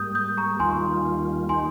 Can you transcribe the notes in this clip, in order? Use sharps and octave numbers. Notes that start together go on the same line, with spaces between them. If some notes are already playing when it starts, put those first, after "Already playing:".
Already playing: G#2 G3 A#3 D#6 G6
D#6 G6
A#5 C#6
D#2 D#3 G3 A#3 F4 G#5 C6
D#3 A#3 D#4 G4 G#5 C6